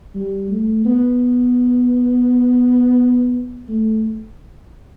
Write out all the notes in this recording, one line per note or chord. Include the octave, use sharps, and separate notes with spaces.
G3
A3
B3
A3